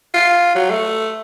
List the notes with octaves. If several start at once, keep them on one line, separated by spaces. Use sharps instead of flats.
F4
F#3
A3